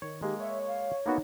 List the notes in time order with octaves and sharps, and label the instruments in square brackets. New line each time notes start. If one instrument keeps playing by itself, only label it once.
[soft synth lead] D#3 [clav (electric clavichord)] C#5
[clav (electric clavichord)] G#3 A#3 [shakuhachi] G4
[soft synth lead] C#5 [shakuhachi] E5
[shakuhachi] F5
[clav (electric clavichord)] A#3 B3 F#4 [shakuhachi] D#4